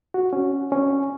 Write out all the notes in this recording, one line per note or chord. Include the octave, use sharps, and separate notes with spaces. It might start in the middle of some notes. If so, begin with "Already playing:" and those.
F#4
C#4
C#4